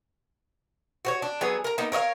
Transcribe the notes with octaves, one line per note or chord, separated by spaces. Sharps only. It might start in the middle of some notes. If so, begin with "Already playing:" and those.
F#4 C5 C#5
D4
F#3 B3 G#4
A#4 A#5
A#3 B3 D#4
A#4 C#5 D#5 F5